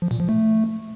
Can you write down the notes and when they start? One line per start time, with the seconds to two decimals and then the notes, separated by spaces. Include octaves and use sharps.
0.02 F3
0.11 A#2
0.20 F3
0.29 A3